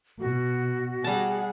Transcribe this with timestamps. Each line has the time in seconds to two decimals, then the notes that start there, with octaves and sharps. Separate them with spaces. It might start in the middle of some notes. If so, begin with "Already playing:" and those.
0.20 B2 F#4
1.04 G3 G#4 F#5 A5